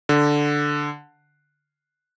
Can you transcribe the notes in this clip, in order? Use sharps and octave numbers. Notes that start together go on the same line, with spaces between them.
D3